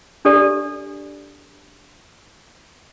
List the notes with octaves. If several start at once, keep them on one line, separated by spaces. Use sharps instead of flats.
D4 G4 A4 D5